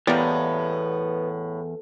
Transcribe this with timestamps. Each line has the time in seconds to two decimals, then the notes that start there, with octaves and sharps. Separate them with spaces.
0.07 E2 A2 G3 A#3 B3